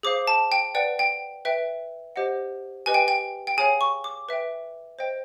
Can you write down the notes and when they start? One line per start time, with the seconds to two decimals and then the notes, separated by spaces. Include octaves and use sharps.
0.03 G#4 C5 F5 D6
0.27 A5
0.52 G5
0.75 B4 D5 F#5 G5
0.99 G5
1.45 B4 E5 G5
2.16 G4 C5 D#5 F#5
2.86 G4 B4 D#5 G#5
2.94 G5
3.08 G5
3.47 G5
3.57 G#4 C#5 F5 G#5
3.81 C#6
4.04 D6
4.29 B4 E5 G5
4.99 C5 D#5 G5